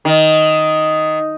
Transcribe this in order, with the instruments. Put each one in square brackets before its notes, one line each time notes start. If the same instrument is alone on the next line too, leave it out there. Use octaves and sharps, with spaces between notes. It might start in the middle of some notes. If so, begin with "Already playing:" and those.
[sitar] D#3